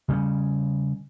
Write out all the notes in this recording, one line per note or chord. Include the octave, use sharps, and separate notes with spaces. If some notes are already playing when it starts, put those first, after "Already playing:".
C#3 G3 B3 C#4